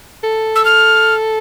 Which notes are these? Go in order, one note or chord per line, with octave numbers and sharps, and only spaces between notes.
A4
E6
F6